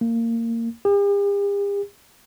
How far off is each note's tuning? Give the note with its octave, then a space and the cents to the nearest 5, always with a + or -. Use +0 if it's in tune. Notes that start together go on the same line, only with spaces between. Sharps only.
A#3 -20
G4 +45